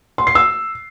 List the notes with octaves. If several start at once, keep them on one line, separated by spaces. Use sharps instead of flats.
C6
C7
E6